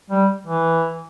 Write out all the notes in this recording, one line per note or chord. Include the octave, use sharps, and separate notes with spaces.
G3
E3